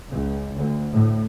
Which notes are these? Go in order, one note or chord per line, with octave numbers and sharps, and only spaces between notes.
C#2
D2
A2